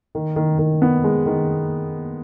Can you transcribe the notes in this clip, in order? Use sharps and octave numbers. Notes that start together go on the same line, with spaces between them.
D#3
D#3
D#3
B3
G#3
D#3